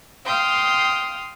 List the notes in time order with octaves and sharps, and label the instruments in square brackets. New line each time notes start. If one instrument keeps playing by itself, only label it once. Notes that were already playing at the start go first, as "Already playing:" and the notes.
[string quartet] F5 G5 C6 D#6